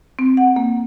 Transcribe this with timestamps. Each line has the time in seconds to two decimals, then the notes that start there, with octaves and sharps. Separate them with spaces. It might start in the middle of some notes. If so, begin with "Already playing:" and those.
0.19 C4
0.37 F#5
0.56 A#3